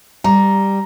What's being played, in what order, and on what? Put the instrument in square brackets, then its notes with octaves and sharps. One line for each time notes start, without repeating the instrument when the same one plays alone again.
[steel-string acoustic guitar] G3 [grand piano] A#5